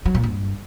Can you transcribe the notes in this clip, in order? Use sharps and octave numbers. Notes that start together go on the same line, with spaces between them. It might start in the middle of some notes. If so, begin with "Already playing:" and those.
F#3
A#2
G2